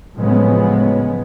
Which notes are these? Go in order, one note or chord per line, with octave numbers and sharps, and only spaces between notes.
A2 C#3 F3 F#3 G#3 B3